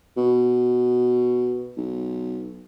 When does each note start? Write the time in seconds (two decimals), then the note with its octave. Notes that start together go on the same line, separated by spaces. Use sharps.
0.17 B2
1.77 B1